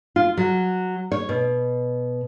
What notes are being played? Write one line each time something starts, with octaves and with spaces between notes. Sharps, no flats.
F4
F#3
C#5
B2